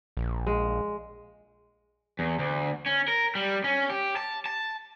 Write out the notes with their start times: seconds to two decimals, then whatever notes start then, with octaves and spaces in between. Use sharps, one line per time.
0.17 A#1
0.47 G#3
2.19 E2
2.39 D2
2.86 C#4
3.08 A#4
3.35 G3
3.64 C#4
3.90 G4
4.16 A5
4.46 A5